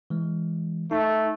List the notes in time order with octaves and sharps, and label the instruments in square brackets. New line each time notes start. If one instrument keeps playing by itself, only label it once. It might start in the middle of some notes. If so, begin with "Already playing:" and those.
[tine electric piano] E3 G#3
[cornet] A3 [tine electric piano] D#4